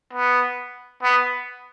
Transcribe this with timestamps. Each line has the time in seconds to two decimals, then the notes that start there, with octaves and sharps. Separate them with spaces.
0.13 B3
1.03 B3